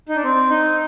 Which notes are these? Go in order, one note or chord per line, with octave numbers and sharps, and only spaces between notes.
D#4
D4
C4
D#4